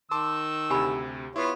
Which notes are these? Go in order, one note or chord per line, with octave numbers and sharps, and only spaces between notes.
D#3 A5 C6 D6 E6
D2 C3 G4 G#5 B5
B3 E4 F4 C#5